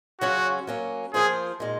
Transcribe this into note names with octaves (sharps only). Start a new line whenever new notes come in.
C#3 F#3 C#4 F4 F#4
F#3 A#3 C#4
F3 A#3 F4 G#4 C5
A#2 G#3 D#4